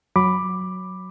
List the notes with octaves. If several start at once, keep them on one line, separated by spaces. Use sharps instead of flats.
F#3 B5 D6